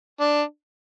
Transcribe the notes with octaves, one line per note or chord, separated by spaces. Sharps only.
D4